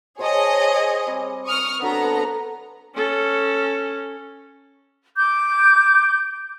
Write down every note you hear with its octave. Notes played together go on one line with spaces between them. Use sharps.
G#4 C5 C#5 D#5 G5 A5
G3 C4
C#6 D#6 F6
D3 F#3 B3 A4 A#5
C#4 A4
D6 G6